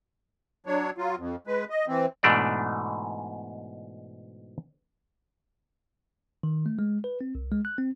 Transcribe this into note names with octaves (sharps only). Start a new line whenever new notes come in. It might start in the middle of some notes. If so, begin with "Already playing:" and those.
F#3 D4 C#5
F#3 F4
F2
G#3 B4
D#5
E3 C4
G#2 B2 E3 A3 D4 D5
D#3
A3
G#3
B4
C4
C2
G#3
F#6
C4